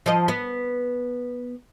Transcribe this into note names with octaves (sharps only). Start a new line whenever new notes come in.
F3 D#5
B3 B4